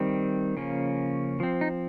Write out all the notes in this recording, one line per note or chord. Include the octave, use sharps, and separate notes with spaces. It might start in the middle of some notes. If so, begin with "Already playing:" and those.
Already playing: D#3 G3 C4
C#3 F3 A#3 C#4
F3 C4
D#4